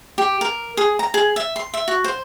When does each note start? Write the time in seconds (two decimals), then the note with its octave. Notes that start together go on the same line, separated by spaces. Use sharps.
0.18 G4
0.41 A#4
0.77 G#4
0.99 A#5
1.14 G#4
1.36 E5
1.56 C6
1.74 E5
1.88 F#4
2.04 C5